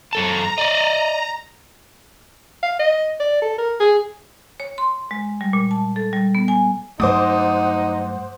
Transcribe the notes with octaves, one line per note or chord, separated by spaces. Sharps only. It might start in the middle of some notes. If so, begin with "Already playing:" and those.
F#2 A4 A5 A#5
D5 D#5
F5
D#5
D5
A4
A#4
G#4
C#5
C6
G#3
G3
A#2
A5
A4
G3
B3
G#5
G2 F#3 A3 D#4 C5 F#5 D6 D#6